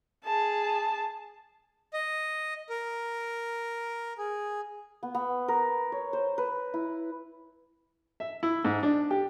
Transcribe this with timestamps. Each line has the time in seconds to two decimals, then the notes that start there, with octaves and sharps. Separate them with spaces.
0.24 G#4 A5
1.93 D#5
2.70 A#4
4.18 G#4
5.03 B3
5.15 B3
5.48 A#4
5.92 C#5
6.13 C5
6.38 B4
6.74 E4
8.20 E5
8.43 E4
8.65 G#2
8.83 D4
9.11 G4